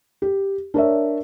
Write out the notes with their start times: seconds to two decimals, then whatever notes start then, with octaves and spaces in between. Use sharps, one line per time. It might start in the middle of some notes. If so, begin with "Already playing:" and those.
0.22 G4
0.74 D4 A#4 C#5 E5